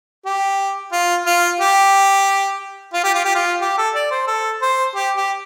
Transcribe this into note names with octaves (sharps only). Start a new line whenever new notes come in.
G4
F4
F4
G4
F4
G4
F4
G4
F4
G4
A4
D5
C5
A4
C5
G4
G4